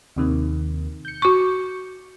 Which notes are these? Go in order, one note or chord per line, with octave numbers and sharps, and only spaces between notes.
D#2 C3 D#3
G6 C#7
F#4 C#6